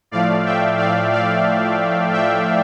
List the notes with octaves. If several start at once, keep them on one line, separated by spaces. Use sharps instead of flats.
A2 F3 A3 D5 F5
E5 G5
D5 F5
D5 F5
E5 G5